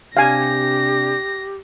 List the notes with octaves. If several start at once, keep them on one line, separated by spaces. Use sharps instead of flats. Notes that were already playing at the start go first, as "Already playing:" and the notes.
C3 D4 G4 F5 G#5 A#6